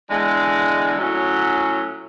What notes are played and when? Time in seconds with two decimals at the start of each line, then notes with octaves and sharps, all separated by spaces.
0.10 E2 D3 G#3
0.98 A2 F#3 C#4 F#4